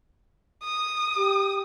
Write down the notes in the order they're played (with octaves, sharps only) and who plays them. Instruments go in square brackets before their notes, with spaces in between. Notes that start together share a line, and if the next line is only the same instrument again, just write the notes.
[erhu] D#6
[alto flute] G4